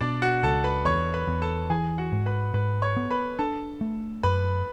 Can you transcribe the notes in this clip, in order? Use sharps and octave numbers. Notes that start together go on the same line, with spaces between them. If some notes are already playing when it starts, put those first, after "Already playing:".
B2 D4 D5
F#4 F#5
C#2 A4 A5
B4 B5
E2 C#5 C#6
B4 B5
E2
A4 A5
E3 G#4 G#5
F#4 F#5
G#2
B4 B5
G#2 B4 B5
C#5 C#6
B3
B4 B5
D4 A4 A5
A3
F#2 B4 B5